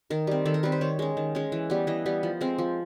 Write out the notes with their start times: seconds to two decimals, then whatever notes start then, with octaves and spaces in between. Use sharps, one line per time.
0.10 D#3 A#4
0.27 G3 C4
0.45 D#3 A4
0.54 A#4
0.63 G3 C4 B4
0.72 C5
0.81 D#3 C#5
0.99 G#3 C#4
1.17 D#3
1.35 G#3 C#4
1.52 E3
1.70 G3 B3
1.87 E3 D#5
2.06 G3 B3
2.23 F3
2.41 G#3 C4
2.58 F3